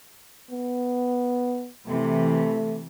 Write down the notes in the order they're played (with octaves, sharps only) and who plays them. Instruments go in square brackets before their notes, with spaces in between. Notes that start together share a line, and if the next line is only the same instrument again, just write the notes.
[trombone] B3
[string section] C3 E3 [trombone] A3